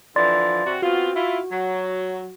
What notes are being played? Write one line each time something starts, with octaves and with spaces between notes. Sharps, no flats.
D3 E3 F3 D5 C6 A6
C3 F#4
B3 C4 F4 F#4
E4 F4
F#3